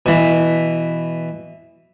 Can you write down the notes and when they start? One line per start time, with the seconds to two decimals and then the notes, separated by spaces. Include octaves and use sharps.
0.06 B2 E3